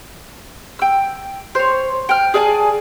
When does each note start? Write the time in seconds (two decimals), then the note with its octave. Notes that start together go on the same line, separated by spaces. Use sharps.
0.79 G5 E6
1.55 C5 C#5
2.09 G5 F6
2.34 G#4 D5 G#5 A5